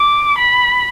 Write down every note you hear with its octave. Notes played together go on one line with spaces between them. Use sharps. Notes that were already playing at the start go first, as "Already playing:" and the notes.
Already playing: D6
B5